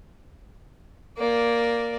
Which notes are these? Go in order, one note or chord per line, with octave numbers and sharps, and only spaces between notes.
A#3 D5